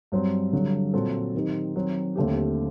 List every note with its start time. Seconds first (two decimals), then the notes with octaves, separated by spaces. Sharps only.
0.12 G2 F#3 C4
0.53 G2 D3 F#3
0.94 A#2 F#3 C4 F#4 A4
1.35 D#3 F#3 C4 D#4 G4
1.75 D#3 F#3 C4
2.16 D#2 D3 A3 C4 G4